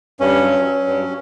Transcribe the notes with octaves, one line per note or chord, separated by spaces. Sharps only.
G2 C#4
F#3
F#3
G2